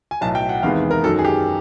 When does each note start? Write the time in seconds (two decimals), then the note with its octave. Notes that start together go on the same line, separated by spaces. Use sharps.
0.11 G#5
0.21 B1 A2 F#3 A5
0.35 G5
0.49 F#5
0.63 E2 C3 D#3 G#3 B3 F5
0.91 A#4
1.04 F#2 D#3 F#3 A4
1.19 G#4
1.25 G4